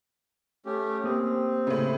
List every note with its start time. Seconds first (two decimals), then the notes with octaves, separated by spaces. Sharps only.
0.66 A3 C#4 G4
1.04 A#3 C4 G4 D#6
1.67 A2 C#3